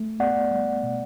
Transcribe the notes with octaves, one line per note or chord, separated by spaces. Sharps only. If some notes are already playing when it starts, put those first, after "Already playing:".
Already playing: A3
B3 D5 F#5
G3
B2